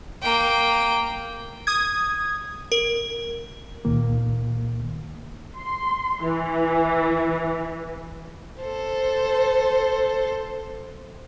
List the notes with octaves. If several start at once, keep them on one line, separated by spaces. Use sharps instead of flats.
A#3 G5
D#6 G#6
A#4
C#2 A#2 D#3 A#3
C6
E3
A4 C5